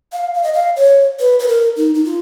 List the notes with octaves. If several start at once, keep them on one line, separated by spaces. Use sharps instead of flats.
F5
F5
D#5
F5
C#5
B4
B4
A#4
D#4
D#4
F4